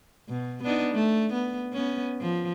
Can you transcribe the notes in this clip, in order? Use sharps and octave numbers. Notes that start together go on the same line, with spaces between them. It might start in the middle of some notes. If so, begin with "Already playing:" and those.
B2
B3 D4 D#4
A3
B3
B3 C#4
F3